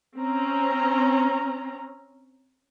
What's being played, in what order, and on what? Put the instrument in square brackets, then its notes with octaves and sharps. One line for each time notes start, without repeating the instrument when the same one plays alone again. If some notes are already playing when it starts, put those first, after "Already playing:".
[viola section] C4 C#4 A#5